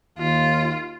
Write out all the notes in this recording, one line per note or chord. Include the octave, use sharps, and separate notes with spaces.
D#2 F4